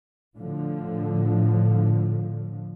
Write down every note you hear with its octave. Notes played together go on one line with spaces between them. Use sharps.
A2 D3 F3